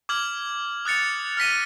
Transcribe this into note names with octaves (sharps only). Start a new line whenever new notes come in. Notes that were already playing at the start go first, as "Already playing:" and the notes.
D6 F6 G#6 F#7
D#6 F#6 A6 C#7 F7
F6 A#6 B6 D#7